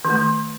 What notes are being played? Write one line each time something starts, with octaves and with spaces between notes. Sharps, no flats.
D#3
A3
D#3